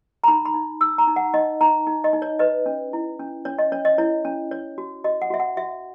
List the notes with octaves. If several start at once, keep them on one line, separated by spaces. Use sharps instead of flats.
A#5
D#4 B5
B5
D#4
D#4 E6
A#5
D#4
F#5
D#4 D#5
D#4 A#5
D#4
D#5
D#4
C#5
B4 D#5
C#4
E4
C#4
C#4 C#5
D#5
C#4 C#5
D#5
E4 C#5
C#4
C#5
F#4
F#4 D#5
F#5
F#4 E5
F#5
F#4 E5